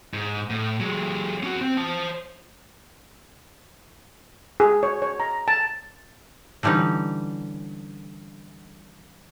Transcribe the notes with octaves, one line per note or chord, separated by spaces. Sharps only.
G#2
A2
F#3 G#3
C#4 F#4
C4
C5 A5
G#4
C#5
C#5
A#5
A5
D3 E3 G3 C#4 D#4